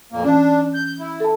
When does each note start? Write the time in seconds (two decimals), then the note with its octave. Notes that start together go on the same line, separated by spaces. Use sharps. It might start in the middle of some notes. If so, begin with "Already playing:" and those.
0.12 F2 A#2 A#3
0.24 E3 C#4 D4
0.74 G6
0.99 E4
1.20 A4 A5